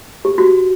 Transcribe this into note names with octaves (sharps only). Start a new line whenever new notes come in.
G4
F#4